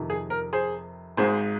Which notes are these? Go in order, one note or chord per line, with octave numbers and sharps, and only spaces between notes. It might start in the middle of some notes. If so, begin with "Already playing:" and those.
Already playing: F2 C3 D#3
G#4
A#4
G#4 C5
G#1 G#2 G#3 G#4 C5